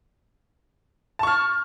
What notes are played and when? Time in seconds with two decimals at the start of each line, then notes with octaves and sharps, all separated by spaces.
1.19 A5
1.23 C#6
1.27 F6